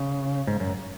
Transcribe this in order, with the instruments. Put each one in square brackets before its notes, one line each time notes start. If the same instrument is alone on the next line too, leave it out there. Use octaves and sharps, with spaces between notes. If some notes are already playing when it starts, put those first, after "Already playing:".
Already playing: [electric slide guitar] C#3
G#2
F#2